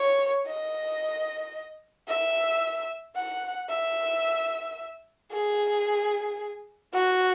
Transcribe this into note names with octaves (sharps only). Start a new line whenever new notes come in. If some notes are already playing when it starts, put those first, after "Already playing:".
Already playing: C#5
D#5
E5
F#5
E5
G#4
F#4